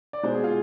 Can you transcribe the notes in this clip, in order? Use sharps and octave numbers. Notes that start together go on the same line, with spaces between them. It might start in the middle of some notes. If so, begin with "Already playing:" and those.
D5
B2 G#3 C5
G#4
F4